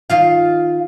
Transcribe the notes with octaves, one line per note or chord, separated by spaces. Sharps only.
D#3 F4 F5